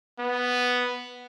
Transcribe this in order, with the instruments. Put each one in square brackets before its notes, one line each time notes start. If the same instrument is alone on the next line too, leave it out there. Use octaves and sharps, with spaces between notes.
[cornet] B3